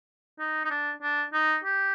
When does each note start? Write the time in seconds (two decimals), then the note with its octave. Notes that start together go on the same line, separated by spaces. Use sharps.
0.39 D#4
0.65 D#4
0.71 D4
1.02 D4
1.33 D#4
1.64 G4